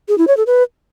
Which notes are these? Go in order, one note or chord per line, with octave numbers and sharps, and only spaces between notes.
G#4
E4
C#5
A4
B4